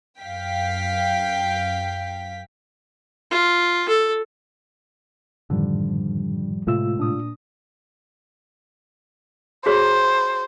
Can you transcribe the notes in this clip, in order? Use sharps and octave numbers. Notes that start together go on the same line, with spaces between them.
F#2 F5 G5 B6
F4
A4
F#2 A2 D3 D#3 F3 G3
A2 C3 G#3 A3 F4 E6
A#2 D4 D#6
F#4 G#4 C5 C#5